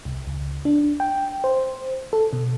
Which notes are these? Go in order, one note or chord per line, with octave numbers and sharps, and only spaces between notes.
C2
C#2
D4
G5
C5
A4
B2